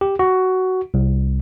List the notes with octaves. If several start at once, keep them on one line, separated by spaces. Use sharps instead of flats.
G4
F#4
C2